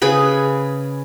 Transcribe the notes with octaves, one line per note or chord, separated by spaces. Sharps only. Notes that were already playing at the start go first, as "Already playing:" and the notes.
C#3 G#4 B4 B5